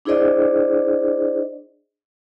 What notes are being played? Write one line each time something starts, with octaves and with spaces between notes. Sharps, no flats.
D4 E4 G#4 C5 D5 D#5